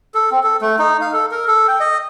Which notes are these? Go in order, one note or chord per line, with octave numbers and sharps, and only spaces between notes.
A4
C4
A4
A3
D#4
F5
A4
A#4
A4
G5
D#5